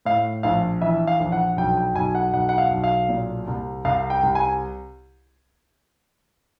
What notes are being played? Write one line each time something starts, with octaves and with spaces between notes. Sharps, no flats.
A2 F5
A#1 F5
E3 E5
F5
A#1
F#5
B1 G5
G5
B1 G#5
F#5
B1 F#5
F#5
F5
B1
F5
A#2
C2
C2 F5
G5
C2
G#5